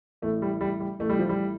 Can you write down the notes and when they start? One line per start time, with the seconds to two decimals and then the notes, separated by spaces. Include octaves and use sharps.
0.22 A1 A2 A3
0.42 G3
0.61 G3
0.80 G3
0.99 A1 A2 A3
1.09 G3
1.19 F3
1.29 G3